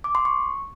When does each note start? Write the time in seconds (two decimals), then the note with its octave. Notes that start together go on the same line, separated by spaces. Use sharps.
0.04 D6
0.15 C6
0.25 C#6